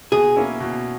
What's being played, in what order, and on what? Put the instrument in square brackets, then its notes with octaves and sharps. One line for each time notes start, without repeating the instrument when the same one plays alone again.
[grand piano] B2 [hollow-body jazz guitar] G#4
[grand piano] A#3 C#4 E4
B2